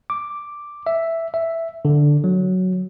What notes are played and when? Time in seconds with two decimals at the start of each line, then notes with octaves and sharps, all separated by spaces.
0.10 D6
0.87 E5
1.34 E5
1.85 D3
2.24 F#3